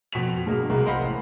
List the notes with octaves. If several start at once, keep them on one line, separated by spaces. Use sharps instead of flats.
F2 B2 B6 F7
G2 B2 G#3 A#3
C2 B2 G#3 A#3 A#5
A#4 C5 D#5 F5 F#5 B5
A1